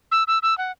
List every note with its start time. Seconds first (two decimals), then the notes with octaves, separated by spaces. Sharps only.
0.12 E6
0.28 E6
0.43 E6
0.58 F#5